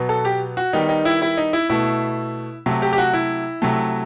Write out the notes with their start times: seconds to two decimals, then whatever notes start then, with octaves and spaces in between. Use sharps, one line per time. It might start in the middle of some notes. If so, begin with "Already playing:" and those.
Already playing: B2 F#3 B3
0.09 A4
0.25 G4
0.57 F#4
0.73 D#3 G3 B3 D#4
0.89 D#4
1.05 E4
1.22 E4
1.37 D#4
1.53 E4
1.69 B2 A3 E4
2.66 C3 F#3 A3
2.82 G4
2.93 G4
2.98 F#4
3.13 E4
3.62 C3 F#3 A3